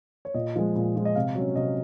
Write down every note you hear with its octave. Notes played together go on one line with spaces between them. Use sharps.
C#5
A#2 D#5
F3 G#3
A#2
F3 G#3
D#5
C3 F5
F#3 C#4
C3 D#5